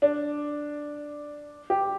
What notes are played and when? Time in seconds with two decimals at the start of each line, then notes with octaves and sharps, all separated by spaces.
0.02 D4
1.70 G4